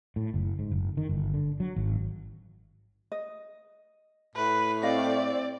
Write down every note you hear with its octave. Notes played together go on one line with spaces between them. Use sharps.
A2
F#1
G#2
F#1
D#3
G1
D3
F#3
G#1
D#5
A2 B4
C4 D5 D#5 F5